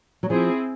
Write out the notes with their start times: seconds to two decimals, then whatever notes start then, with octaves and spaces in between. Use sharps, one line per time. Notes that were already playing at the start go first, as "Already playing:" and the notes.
0.23 F#3
0.30 F3 C4 E4 G#4